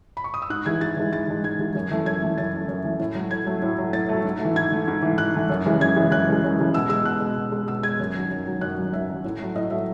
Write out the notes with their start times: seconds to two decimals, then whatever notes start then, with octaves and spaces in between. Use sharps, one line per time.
0.17 B5
0.24 C#6
0.34 D#6
0.42 E6
0.50 G#2 F#6
0.66 E3 G#3 G#6
0.81 G#2 A6
0.97 E3 G#3
1.12 G#2 A6
1.28 E3 G#3
1.44 G#2 G#6
1.59 E3 G#3
1.75 F#2
1.91 E3 A3
2.06 F#2 G#6
2.22 E3 A3
2.38 F#2 A6
2.53 E3 A3
2.68 F#2
2.84 E3 A3
2.99 A2
3.15 F#3 A3
3.31 A2 G#6
3.47 F#3 A3
3.62 A2
3.78 F#3 A3
3.93 A2 A6
4.09 F#3 A3
4.25 G#2
4.40 A3
4.45 E3
4.56 G#2 G#6
4.72 E3 A3
4.88 G#2
5.02 E3 A3
5.18 G#2 F#6
5.34 E3 A3
5.50 F#2
5.65 C#3 E3 G#3
5.80 F#2 G#6
5.96 C#3 E3 G#3
6.11 F#2 F#6
6.28 C#3 E3 G#3
6.44 F#2
6.58 C#3 E3 G#3
6.74 B2 E6
6.89 G#3 E6
7.05 B2 F#6
7.21 G#3
7.37 B2
7.52 G#3
7.68 B2 E6
7.83 G#3 G#6
8.00 F#2
8.15 D#3 F#3
8.31 F#2
8.45 D#3 F#3
8.61 F#2 F#6
8.78 D#3 F#3
8.93 F#2 E5
9.09 D#3 F#3
9.24 A2
9.40 F#3 A3
9.56 A2 D#5
9.71 F#3 A3 E5